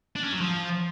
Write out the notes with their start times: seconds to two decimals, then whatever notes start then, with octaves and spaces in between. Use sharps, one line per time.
0.16 D4
0.24 C#4
0.32 F#3
0.41 F3